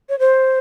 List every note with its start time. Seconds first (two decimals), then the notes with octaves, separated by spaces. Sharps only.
0.09 C#5
0.19 C5